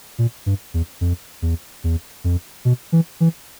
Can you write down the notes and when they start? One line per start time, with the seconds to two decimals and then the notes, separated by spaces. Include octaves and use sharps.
0.18 A#2
0.46 G2
0.74 E2
1.01 F2
1.42 E2
1.84 E2
2.24 F2
2.65 B2
2.92 E3
3.20 E3